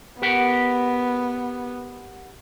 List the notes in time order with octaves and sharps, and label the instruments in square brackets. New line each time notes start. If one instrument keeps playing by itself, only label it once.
[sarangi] B3 [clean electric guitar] G4 A#4 F#5